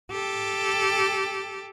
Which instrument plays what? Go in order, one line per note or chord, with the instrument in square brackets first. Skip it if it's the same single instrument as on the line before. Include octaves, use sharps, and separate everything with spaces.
[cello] G4 A4